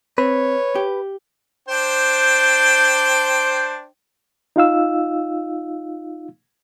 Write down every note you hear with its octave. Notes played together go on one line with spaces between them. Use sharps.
C4 B4 C#5
G4
D4 C5 G5
D#4 F4 F5 E6